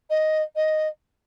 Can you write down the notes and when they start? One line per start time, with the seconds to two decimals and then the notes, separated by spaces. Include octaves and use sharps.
0.09 D#5
0.55 D#5